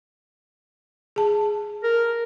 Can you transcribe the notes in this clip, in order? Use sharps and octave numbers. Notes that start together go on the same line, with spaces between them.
G#4 A5
A#4